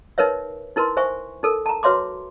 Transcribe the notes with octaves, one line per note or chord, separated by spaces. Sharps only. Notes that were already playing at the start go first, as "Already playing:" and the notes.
D#4 A#4 B4 C#5 E5
D#4 E4 A#4 B4 C6
C5 E5 G#5 C#6
D#4 A4 A#4
A5 A#5
F#4 B4 C#5 E5 C6 D6